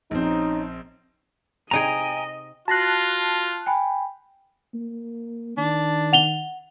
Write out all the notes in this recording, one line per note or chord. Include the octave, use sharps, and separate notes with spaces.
A#1 C4 C#4 D#4
C3 D#4 G#4 D#5 G5 G#5 A#5
F4 F#4 A5 F#6 A#6 C7
G5 G#5 B5
A#3
D#3 D4
F#5 F7 G7